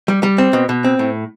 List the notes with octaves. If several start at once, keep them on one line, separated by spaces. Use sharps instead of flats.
G3
G3
C4
B2
B2
C4
A2